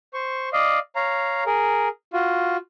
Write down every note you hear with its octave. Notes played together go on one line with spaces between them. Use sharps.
C5 C#6
D5 D#5 F5
C#5 F5 A#5
G#4 A#4
F4 F#4